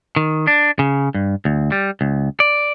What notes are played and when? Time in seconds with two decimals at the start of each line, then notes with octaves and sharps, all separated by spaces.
0.16 D#3
0.47 D4
0.79 C#3
1.14 G2
1.45 D2
1.72 G3
2.01 C#2
2.40 D5